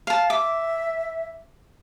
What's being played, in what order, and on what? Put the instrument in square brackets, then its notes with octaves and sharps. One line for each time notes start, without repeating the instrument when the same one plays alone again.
[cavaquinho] F5 A5
[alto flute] E5 [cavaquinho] D6